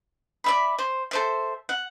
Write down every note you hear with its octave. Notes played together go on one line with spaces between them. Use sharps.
D5 E5 B5
C5
A4 C5 E5
F#5